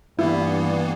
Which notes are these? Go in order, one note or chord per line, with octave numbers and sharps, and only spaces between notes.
G2 E3 A#3 B3 E4